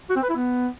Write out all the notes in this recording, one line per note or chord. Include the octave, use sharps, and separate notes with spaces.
F#4
C4
B4
E4
B3